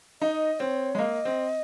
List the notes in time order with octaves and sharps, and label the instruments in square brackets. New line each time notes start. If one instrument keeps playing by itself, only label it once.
[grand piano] D#4 [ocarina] D#5
[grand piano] C4 [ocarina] C#5
[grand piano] G#3
[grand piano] A#3 [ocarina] D#5
[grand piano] C4